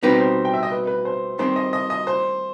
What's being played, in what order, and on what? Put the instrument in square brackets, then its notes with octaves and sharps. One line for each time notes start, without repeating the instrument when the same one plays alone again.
[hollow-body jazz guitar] B2 G3 C4 D#4 G4 [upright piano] B4
[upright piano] C5
G5
E5
D#5
B4
B4
C5
[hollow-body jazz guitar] D#3 G3 C4 [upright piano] C5
[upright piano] D#5
D#5
D#5
C5